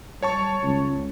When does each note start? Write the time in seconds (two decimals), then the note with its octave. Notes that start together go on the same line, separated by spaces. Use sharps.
0.23 G3 C#5 A5 C#6
0.64 C#2